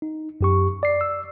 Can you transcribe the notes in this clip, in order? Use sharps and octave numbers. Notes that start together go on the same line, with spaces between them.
D#4
F#2 G4 C#6
D5 C7
E6